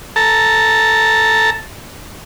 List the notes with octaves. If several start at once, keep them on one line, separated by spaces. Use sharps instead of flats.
A4 A5 A#5